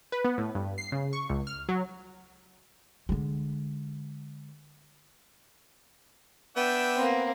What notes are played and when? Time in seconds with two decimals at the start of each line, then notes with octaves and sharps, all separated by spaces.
0.12 B4
0.25 B3
0.38 A2
0.55 G2
0.78 C7
0.92 C#3
1.13 C#6
1.30 C#2
1.47 F6
1.69 F#3
3.09 D3 G#3
6.56 B3 D4 E5 G5
6.96 A#3 C4